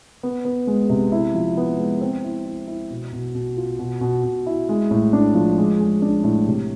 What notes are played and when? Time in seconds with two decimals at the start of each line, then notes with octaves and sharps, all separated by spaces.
0.23 B3
0.45 B3
0.67 G#3
0.90 C3
1.12 E4
1.34 F3
1.57 B3
1.78 G#3
2.01 C4
2.24 E4
2.46 E4
2.67 E4
2.90 B2
3.13 B2
3.35 B2
3.57 F4
3.79 B2
4.01 B2
4.24 B2
4.46 E4
4.69 G#3
4.91 A2
5.13 D4
5.35 F3
5.58 G#3
5.80 G#3
6.02 D4
6.24 A2
6.47 C3